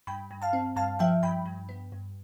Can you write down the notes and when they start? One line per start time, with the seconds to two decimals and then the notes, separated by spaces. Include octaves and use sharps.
0.07 G2 G5 B5
0.31 G2
0.42 F5 A5
0.53 C4
0.76 G2 F5 A5
0.99 F3 E5 G5
1.23 G2 G5 B5
1.46 G2
1.69 B3
1.92 G2